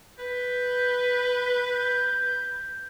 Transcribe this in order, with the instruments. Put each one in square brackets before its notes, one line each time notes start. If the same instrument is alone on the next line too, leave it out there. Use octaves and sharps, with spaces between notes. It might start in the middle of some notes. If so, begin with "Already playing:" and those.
[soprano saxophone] B4 [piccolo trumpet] G6